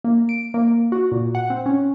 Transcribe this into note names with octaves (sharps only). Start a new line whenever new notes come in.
A#3
D7
A#3
F#4
A#2
F#5
C4
C#4